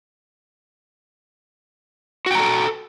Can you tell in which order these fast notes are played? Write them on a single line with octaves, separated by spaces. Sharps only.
F#4 G5 A#5 A4